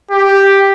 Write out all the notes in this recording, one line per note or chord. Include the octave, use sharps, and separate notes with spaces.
G4